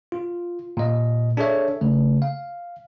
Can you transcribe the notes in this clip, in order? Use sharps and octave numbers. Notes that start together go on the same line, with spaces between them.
F4
A#2 D#5
D4 G#4 A4 C#5 E5
C#3 A3
F5